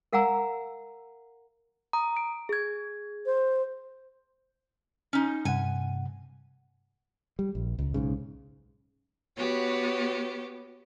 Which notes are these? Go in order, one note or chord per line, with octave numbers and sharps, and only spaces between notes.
A#4 F5 F#5 G#5 A#5 E6
A#5 D#6
D7
G#4 G#6
C5
C#4 D#4
G2 C3 F#5 G#5
G3
A#1
C#2
B1 G#2 C#3
B3 F#4 G4 C#5